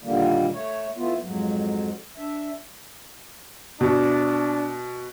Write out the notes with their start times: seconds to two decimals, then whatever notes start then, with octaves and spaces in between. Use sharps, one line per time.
0.04 A#2 D3 D#3 G3 A#3
0.53 A3 C#5
0.97 E3 A3 B3 F4
1.21 F2 G#2 F#3
2.17 D4 E5
3.81 B2 D4